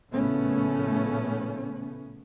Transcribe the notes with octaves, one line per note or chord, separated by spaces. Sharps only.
A#1 A2 C#3 A3 B3 C#4